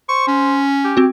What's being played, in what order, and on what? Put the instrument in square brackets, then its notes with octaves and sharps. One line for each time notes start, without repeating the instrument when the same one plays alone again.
[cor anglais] C5 [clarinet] C#6
[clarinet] C#4
[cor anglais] G4
[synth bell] C4 F#4